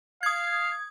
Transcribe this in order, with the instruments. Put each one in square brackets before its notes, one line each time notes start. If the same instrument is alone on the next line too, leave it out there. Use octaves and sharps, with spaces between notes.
[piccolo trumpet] F5 [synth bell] D#6 G#6